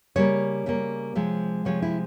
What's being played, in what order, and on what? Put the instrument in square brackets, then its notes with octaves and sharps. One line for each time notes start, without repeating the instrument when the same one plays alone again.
[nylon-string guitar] C#3 G3 A#3 C#5
C#3 G3 A#3
C3 F3 G#3
C3 F3 G#3 C#5
E4